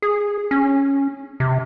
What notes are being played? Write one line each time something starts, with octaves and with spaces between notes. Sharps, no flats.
G#4
C#4
C3